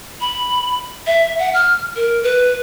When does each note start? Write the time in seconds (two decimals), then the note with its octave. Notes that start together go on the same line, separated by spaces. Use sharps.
0.21 B5
1.07 E5
1.39 F#5
1.54 F6
1.96 A#4
2.23 B4